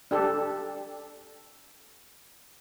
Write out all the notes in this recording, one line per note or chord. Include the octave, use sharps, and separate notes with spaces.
D4 G4 A4